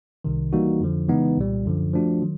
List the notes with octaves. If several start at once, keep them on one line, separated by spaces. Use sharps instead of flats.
C2 C3 D#3
E3 G3 A#3 D#4 F#4
F2 D3 F3
C#3 E3 G#3 B3 D#4
C2 A#2 G3
F#2 D3 F3
F3 A3 D4 F#4
D#3 F#3